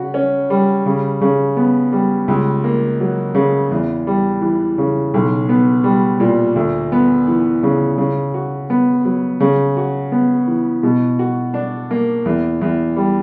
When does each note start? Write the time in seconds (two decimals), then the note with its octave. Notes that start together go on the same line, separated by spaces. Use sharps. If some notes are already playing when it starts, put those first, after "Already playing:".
Already playing: C#3 F#4
0.14 C#4
0.50 G3
0.86 C#3
1.21 C#3
1.57 B3
1.92 G3
2.28 C#2
2.64 A#3
3.00 F#3
3.35 C#3
3.71 E2
4.07 G3
4.41 E3
4.78 C#3
5.14 B1
5.49 B3
5.84 G3
6.20 A#2
6.56 D2
6.92 B3
7.27 E3
7.63 C#3
7.98 C#3
8.34 F#4
8.70 B3
9.05 F#3
9.40 C#3
9.77 F#4
10.12 B3
10.48 E3
10.83 B2
11.19 F#4
11.54 D4
11.91 A#3
12.25 E2
12.61 E2
12.97 G3